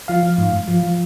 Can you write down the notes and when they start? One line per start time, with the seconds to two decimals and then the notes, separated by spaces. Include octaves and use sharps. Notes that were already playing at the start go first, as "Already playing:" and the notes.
0.08 F3 F5
0.23 F3
0.38 G#2
0.53 G#2
0.68 F3
0.83 F3